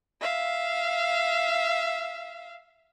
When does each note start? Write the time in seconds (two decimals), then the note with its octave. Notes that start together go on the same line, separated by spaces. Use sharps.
0.21 E5 F5